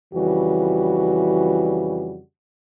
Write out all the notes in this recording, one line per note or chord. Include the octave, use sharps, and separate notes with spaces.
F2 C#3 E3 G3 F#4